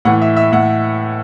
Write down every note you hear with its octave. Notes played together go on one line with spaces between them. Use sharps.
A2 E3 F#5
E5
E5
A2 F#5